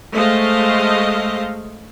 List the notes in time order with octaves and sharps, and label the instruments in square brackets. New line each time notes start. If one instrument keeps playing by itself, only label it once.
[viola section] G#3 A3 C5 D#5 F5